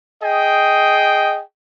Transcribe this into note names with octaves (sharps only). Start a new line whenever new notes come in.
G#4 D#5 G5